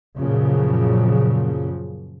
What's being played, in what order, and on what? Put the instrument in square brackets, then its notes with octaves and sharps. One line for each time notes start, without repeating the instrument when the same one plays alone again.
[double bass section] F#2 A#2 C#3 F3 F#3